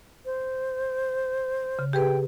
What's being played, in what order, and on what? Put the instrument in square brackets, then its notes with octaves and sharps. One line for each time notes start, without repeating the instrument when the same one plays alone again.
[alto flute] C5
[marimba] C#3
[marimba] G4 G#4 B4 [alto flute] G5